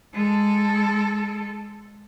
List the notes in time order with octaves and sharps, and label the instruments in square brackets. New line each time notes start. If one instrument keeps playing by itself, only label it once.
[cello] G#3 A4